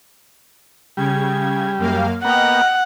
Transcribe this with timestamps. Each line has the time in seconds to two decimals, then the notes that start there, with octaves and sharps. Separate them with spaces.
0.97 C#3 G3 G#6
1.78 F#2 A#3 F5
2.25 A#3 B3 D#5 F#5 G5 F6